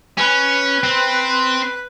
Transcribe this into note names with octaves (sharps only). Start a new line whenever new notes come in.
C#4 B4
C4